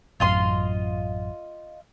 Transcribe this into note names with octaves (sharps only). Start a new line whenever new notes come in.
A1 F#2 F4 D#5 C6